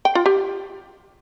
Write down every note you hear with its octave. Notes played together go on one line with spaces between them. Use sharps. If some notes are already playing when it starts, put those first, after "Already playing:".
G5
F4
G4